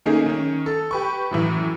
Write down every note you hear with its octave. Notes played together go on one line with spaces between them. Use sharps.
D#3 A3 A#3 C#4 D#4 G#4
D#3 C#4
A4
G4 B4 C#6
F#2 A2 E3